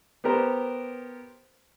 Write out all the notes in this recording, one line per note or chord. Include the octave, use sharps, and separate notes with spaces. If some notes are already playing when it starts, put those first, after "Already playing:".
B3 G4 A#4 C5